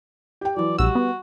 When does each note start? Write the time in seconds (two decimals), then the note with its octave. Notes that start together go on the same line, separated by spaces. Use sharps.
0.41 G4 G5
0.56 E3 F#3 D5
0.79 A#1 G3 F#4 E6
0.95 B3